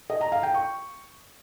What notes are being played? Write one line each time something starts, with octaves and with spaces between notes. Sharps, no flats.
D#5
A#5
F5
G5
C#6